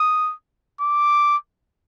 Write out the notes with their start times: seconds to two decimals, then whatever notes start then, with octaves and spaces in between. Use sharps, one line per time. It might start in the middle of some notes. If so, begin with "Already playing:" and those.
Already playing: D#6
0.81 D6